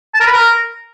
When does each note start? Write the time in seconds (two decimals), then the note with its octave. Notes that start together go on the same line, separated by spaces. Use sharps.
0.14 A5
0.20 A#4
0.27 B4
0.33 A#4